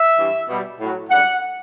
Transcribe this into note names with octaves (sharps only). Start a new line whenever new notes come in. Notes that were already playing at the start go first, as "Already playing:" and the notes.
Already playing: E5
G2 E3 G3
B2 G3
A2 F#3
F#2 D3 G3 F#5